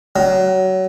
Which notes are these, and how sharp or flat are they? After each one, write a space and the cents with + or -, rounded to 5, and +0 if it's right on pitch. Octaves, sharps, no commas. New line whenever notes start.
F#3 +25